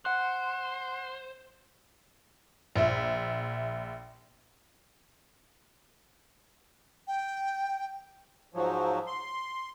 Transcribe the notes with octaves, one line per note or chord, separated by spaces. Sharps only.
C5 F#5 F#6
A#1 E5
G5
G#2 F3 F#3
C6